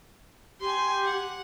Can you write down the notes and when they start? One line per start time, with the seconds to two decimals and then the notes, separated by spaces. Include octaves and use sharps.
0.61 G4 G#5 C6
1.05 F#5